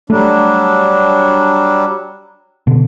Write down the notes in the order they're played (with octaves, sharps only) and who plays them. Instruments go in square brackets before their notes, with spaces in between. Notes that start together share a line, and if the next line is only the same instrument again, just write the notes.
[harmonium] F#3 G3 D4 [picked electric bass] A3
[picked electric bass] B2 D3